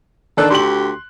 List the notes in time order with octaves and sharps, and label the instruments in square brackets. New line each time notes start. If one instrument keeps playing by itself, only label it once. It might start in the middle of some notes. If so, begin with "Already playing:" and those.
[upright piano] D#3 D4 F#6 [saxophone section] A4
[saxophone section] D2 G4 [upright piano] C6 F#7